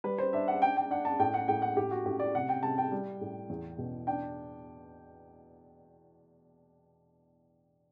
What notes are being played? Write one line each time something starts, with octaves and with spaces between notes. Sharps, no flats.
G3 B4
C5
D4 E5
F#5
D4 G5
G5
D4 F#5
A5
A2 G5
F#5
A2 G5
F#5
A2 G4
F#4
A2 G4
D5
C3 F#5
G5
C3 A5
G5
G3
A2
E2
B2
D4 G5